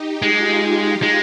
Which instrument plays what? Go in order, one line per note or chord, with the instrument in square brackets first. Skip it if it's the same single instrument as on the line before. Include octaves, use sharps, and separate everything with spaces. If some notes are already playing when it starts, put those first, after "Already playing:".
Already playing: [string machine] D#4 G4
[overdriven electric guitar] G#3 [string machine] F4
[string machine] D#4
[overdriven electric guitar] G#3